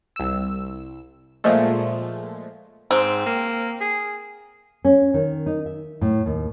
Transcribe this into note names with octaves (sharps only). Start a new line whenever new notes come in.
C2 E6
A#2 F3 G#3 A3
G#2 C4
A#3
G#4
C#4
D#3
D#4
E5
A2
D#2